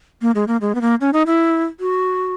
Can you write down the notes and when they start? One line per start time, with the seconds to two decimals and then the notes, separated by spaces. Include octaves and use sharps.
0.22 A#3
0.35 G#3
0.48 A#3
0.61 G#3
0.75 B3
0.81 A#3
1.01 C#4
1.13 D#4
1.27 E4
1.80 F#4